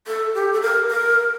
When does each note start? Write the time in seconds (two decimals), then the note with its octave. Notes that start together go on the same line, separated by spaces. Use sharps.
0.07 A4
0.35 G4
0.53 A4
0.62 A#4
0.88 A#4